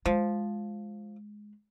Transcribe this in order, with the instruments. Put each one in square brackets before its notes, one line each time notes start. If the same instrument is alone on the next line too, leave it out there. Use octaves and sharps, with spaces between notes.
[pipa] F3 [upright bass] G#3